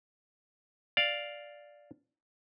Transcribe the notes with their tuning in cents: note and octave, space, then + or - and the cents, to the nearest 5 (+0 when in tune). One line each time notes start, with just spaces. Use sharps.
D5 +0 F5 +0